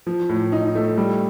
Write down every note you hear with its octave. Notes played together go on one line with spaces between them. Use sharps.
F3
A2
D#4
A3
G3